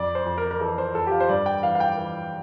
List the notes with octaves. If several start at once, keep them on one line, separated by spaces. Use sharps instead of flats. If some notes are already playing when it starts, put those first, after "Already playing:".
Already playing: F2 D5
C5
F2
A#4
A#4
E3 A4
C5
F2 A4
G4
F4
C5
G2 D5
G5
E3 F5
F5
G5
E3